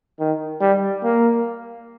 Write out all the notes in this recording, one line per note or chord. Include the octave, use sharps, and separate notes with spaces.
D#3
G3
A#3